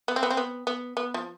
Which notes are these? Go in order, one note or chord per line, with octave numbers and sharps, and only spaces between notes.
B3
C4
B3
C4
B3
B3
B3
F3